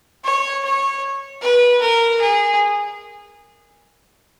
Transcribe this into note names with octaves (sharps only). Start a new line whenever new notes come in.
C#5
C#5
B4
A#4
G#4